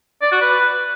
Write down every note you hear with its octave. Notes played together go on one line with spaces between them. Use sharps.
D5
F#4
B4